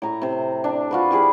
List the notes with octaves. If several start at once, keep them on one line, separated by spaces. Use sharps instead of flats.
A2 A#5 C#6
C3 C5
D4
F4 F#4 B4
E3 G4 G#4 B4